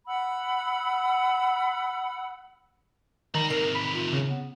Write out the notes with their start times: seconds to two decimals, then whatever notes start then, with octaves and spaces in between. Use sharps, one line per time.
0.07 F#5 B5 E6
3.35 D#3 D5 A#5 B5
3.50 C3 D#3 A#4 C7
3.75 B5
3.94 F4
4.13 C#3
4.27 B3